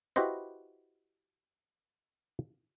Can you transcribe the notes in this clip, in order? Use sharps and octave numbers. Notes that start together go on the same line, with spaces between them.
E4 F#4 G4 B4 C5 D#5